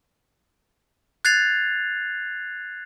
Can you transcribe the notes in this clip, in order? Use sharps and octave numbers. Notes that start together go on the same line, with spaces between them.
F#6 G#6 A6 C7 F7